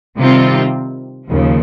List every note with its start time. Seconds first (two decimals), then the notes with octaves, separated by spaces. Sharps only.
0.17 C3 D#3 G3 C4 F4
1.30 D#2 C#3 F3